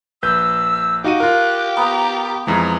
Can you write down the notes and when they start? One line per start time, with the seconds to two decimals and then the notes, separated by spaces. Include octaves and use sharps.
0.23 A#1 B4 E6 G6
1.04 D#4 F#4 G4 F5 D#7
1.20 F4 A#4 F#6
1.77 B3 A#5
2.47 F2 E3 G#3 A#5